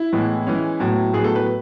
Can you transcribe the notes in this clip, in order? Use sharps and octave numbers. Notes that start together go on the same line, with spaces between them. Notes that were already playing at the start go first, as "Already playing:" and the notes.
Already playing: E4
A2 E3 G#3 B3
E3 G#3 C#4
A2 F#3 B3
A2 F#3 B3 G#4
A4
B4